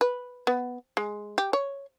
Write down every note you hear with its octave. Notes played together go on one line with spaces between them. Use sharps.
B4
B3
G#3
G4
C#5